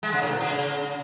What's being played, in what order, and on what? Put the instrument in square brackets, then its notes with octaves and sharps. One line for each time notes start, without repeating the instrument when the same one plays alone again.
[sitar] G#3
C#3
A2
B2
C#3